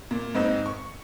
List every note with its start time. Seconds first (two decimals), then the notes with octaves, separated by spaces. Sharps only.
0.11 A#2
0.35 G#2 C4 D#4
0.66 C#6